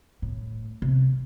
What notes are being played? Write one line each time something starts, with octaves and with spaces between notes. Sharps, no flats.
A2
C3